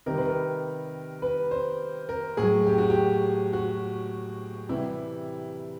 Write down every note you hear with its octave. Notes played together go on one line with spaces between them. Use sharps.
C3 D#3 G3 A#4
B4
A#4
B4
C5
A#4
A2 F#3 G#4
G4
F#4
G4
F#4
C3 E3 G3 E4